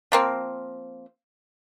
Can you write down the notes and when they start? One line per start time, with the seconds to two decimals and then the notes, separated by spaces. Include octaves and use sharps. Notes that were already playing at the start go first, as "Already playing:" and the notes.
0.12 F3 A#3 C4